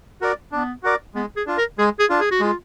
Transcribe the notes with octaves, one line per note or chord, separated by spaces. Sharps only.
F#4 A#4 D5
B3 D4
F#4 A#4 D5
G#3 B3
G#4
D4 F4
A#4
G#3 G#4
G#4
D4 F4
G#4
F#4
G#3 F4